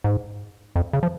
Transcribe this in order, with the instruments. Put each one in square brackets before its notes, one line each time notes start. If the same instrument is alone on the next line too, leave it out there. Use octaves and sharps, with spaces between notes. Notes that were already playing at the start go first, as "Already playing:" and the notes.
[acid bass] G#2
F2
C#3
F3